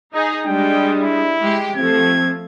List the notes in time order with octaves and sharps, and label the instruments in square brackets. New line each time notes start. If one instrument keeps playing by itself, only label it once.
[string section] D#4 G#4
[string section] G3 G#3 [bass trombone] D4 [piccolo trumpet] G5
[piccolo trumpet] E4
[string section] G#3 G4
[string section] F3 A3 [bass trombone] C4 [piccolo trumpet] G#6